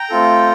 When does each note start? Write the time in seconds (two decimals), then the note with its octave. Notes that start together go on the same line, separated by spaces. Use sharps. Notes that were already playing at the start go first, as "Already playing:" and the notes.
Already playing: G5 A#5
0.10 A3 C4 F4 A4